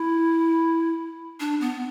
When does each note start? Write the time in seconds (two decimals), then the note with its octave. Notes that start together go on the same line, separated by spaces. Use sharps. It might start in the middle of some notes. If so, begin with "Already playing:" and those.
Already playing: E4
1.40 D4
1.61 B3